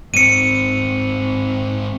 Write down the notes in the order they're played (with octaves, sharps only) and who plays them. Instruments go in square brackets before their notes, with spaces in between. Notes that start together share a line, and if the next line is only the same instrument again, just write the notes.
[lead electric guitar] G#2 C4 [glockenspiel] C#7 D#7